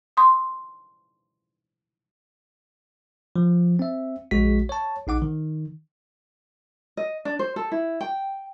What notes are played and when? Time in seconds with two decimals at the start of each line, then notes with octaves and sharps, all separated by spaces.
0.17 C6 D#6
3.36 F3
3.79 C4 E5
4.31 A#1 G#3 F#4 B6
4.69 C#5 A5
5.07 A#1 D#4 F#5 D6
5.22 D#3
6.97 D#5
7.25 D4
7.39 C5
7.56 A4
7.72 E4
8.01 G5